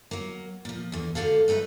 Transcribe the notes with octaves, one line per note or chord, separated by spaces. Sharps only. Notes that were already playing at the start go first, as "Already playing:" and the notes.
F#3 A#3
A#2 F3
E2 D3
G#2 D3 F#4 A4 F5
F#2 A3 D#4 G#4 B4